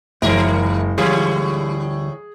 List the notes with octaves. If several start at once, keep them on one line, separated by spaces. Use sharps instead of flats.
F#1 F#2 E3 G#3 A#4 E5
D2 A2 E3 G3 F4 G#4